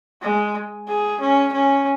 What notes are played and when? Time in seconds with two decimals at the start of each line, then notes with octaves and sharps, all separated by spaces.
0.22 G#3
0.88 G#4
1.21 C#4
1.52 C#4